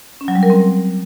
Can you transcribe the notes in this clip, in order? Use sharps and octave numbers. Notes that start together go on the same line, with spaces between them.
C#4
F#3
G3
A#4
C4